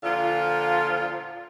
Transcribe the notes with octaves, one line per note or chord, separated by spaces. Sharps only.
A#2 D3 F3 F4